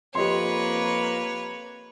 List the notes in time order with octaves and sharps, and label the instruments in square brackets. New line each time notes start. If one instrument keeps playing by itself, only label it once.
[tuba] F2 [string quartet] A#3 B4 [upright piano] G4 D#5 C6 [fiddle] C#5